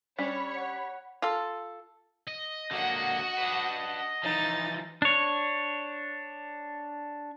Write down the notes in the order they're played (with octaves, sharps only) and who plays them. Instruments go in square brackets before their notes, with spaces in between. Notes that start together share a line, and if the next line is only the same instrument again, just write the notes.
[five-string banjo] G3 C#4 D4 [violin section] C#5 [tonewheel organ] B5
[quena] F#5
[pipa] F4 A4
[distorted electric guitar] D#5
[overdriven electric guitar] D3 A#3 [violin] F#4 F#5
[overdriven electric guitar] D4 B4
[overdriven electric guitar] E3 F3 [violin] D#4 A6
[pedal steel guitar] D4 C#5